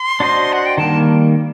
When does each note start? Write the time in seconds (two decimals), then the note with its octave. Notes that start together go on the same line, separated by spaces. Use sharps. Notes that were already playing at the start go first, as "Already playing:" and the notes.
Already playing: C6
0.20 D4 F#4 C5 D#5
0.53 F#5
0.66 G5
0.78 D#3 G3 A#3 A5